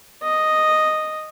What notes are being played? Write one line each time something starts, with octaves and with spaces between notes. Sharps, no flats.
D#5